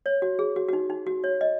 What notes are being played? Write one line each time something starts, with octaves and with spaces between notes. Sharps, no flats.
C#5
F#4
G#4
F#4
F#4
D#4
D#4
F#4
C#5
D#5